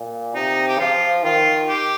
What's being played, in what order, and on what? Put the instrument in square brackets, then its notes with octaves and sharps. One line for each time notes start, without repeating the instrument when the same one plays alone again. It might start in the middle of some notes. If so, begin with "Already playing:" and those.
Already playing: [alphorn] A#2
[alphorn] C3 [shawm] D#4
[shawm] G4
[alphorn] F3 [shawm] F4
[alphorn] D#3 [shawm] F4
[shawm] G4